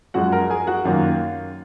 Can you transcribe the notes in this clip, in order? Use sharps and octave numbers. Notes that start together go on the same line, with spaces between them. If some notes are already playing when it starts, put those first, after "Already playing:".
F#2 F3 G#3 F#4 F#5
A#4 A#5
G#4 G#5
F#4 F#5
F#2 D#3 A#3 F4 F5